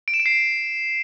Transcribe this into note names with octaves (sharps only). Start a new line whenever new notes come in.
D7
E7
D7
C7